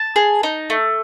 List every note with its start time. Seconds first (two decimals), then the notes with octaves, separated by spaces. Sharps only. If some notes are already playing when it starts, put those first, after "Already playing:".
Already playing: A5
0.16 G#4
0.43 D#4
0.70 A3